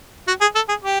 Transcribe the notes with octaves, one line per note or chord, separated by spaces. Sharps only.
F#4
G#4
A4
G#4
G4